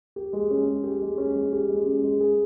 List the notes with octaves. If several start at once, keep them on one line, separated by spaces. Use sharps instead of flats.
G4
G#3
C#4
G#3
G4
G#3
C#4
G#3
G4
G#3
C#4
G#3
G#4